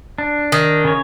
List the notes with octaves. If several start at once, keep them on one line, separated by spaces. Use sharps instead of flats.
D4
D#3
C#3 C#5